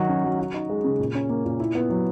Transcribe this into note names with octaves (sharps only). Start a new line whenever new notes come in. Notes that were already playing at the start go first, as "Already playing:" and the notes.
Already playing: D#3 F#3 F#4
C#4
F#3
F#4
D#4
G#3
C#3
A#2
C#4
A#3
A#2
E4
B3
F#3